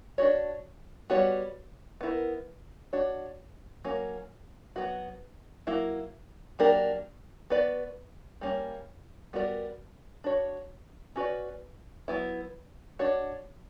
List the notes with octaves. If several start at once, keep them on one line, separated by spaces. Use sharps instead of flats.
D4 F#4 C#5
G3 B3 F#4 C#5
B3 E4 A#4
D4 F#4 C#5
F#3 A#3 C#4
F#3 B3 F#4
F#3 A#3 E4
F#3 A#3 D4 G4 A#4
B3 F#4 B4 D5
G3 A#3 C#4
G3 B3 F#4 A#4 D5
D4 F#4 C#5
C#4 F#4 B4 D5
F#3 B3 E4
D4 F#4 C#5